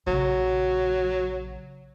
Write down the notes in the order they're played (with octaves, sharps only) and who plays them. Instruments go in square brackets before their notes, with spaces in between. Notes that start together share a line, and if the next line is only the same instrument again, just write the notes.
[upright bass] A#1 C#3 [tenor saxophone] F#3